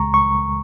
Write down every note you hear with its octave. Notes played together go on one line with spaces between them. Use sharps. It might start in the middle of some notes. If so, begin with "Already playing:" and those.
Already playing: C#2 C#3 G#3 A#5 C#6
C#6